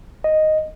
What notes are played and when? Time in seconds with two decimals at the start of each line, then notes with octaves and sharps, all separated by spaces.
0.24 D#5